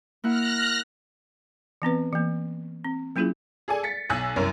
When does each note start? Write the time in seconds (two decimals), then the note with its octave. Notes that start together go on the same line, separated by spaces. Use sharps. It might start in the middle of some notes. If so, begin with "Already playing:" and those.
0.24 A#3 E4 F#5 F6 F#6 A#6
1.82 E3 B3 C4 B4
2.13 E3 A#3
2.85 C4
3.16 F#3 A#3 C#4 E4 F4 G#4
3.68 G#4 A4 D5 G#5
3.83 A6 B6 C#7
4.10 B1 G#5 E6 F#6
4.36 C2 F#2 C#4 A#4